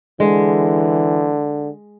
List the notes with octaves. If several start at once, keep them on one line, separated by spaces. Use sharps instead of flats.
D3 E3 G#3